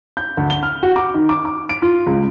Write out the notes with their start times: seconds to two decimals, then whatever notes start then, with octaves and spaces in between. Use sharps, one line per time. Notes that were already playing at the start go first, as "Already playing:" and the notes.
0.17 G6
0.37 D2
0.50 G7
0.63 F6
0.83 F#4
0.96 D6
1.14 D#3
1.29 D6
1.45 D6
1.69 D7
1.82 F4
2.06 C#2